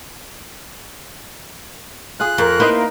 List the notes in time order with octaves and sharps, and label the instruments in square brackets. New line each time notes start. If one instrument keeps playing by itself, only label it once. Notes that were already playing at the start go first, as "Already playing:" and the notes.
[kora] F4 G#4 [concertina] F#6
[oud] F2 [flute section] A#4
[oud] A#3 C4 E4 [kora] D#4 B4